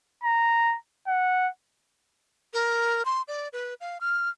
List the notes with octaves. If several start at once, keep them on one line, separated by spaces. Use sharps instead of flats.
A#5
F#5
A#4
C6
D5
B4
F5
F6